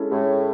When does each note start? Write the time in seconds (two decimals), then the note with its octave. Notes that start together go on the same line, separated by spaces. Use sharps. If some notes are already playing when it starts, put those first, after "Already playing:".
Already playing: G#3 C#4 E4 A4
0.11 A2 G#3